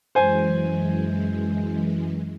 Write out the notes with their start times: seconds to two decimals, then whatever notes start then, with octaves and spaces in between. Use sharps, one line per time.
0.15 F#2 E3 G#3 C5 G#5